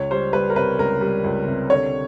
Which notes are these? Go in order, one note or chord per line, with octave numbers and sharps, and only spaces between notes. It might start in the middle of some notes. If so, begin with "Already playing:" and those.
Already playing: C#2 C#5
G3 C5
G3 B4
A#4
C3 B4
C#2 A#4
G3
C#2
C3
D3 C#5